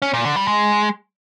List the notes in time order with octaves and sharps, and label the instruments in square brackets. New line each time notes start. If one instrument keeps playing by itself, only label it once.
[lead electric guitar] C#4
A#2
D3
G3
G#3